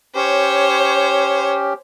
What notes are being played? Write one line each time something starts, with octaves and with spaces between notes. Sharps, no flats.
C#4 G4 C5 C#5